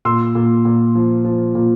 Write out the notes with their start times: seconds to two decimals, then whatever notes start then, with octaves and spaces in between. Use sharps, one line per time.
0.05 A#2 C6 E6
0.35 A#2
0.65 A#2
0.95 F3
1.24 F3
1.55 A#2